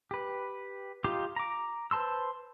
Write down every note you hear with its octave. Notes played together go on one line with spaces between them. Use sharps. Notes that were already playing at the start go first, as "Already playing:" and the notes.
G4 B4
D#4 F4 G4 F5 D6
A#5 D6
B4 C5 A5 C6 E6